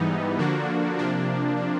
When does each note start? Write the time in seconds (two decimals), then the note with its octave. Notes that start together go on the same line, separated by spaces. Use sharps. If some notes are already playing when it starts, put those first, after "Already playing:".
Already playing: G#2 E3 G3 B3 D#4
0.38 D3 F3 A#3 D4 F#4
0.99 C3 F3 A#3 D4